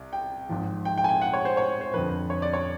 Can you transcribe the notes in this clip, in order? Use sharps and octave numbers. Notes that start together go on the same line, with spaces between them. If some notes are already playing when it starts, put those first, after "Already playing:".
Already playing: C2
G5
G#1 G#2 F3
G5
G5
G#5
G5
F#5
C#5
C5
C#5
C5
F2 D3 F3 B4
C#5
D5
C#5